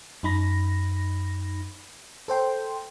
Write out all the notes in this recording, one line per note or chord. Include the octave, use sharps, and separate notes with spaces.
F#2 D#4 B5 A#6
A4 C5 G5 C6